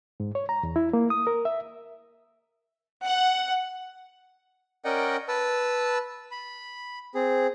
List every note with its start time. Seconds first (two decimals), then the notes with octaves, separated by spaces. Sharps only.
0.20 G#2
0.35 C#5
0.49 A#5
0.63 E2
0.76 E4
0.93 A#3
1.10 D#6
1.27 A#4
1.45 E5
3.04 F#5
4.84 C#4 A#4 D5 D#5 F#5 G5
5.28 B4 A5 E6
6.31 B5
7.15 C4 G#4